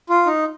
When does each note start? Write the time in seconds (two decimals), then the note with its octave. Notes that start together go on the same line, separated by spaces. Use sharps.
0.09 F4
0.26 D#4